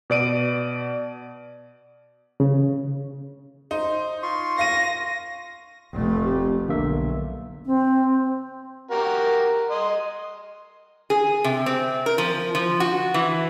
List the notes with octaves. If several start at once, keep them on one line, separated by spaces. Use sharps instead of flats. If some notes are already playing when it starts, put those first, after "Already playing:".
B2 D5 D7 D#7
C#3
D#4 C5
F4 C6 C#6
F5 A#6 D#7
F1 A3
C4 G4
B1 D3 A#3 E5
C4
F#4 G4 A#4
D#5 C6
G#4
C3
C4
A#4
F3
F3
F#4
E3